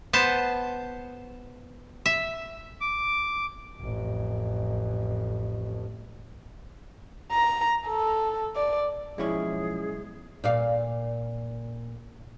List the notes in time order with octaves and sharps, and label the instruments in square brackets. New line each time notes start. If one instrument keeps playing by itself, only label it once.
[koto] B3 C5 A5
E5
[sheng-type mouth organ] D6
[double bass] A1 F2
[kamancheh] A#5
A4
D5
[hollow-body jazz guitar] B1 E4 C#5 [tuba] F3 [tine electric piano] G#3 C#4 [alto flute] G#4
[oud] A#2 D5 F5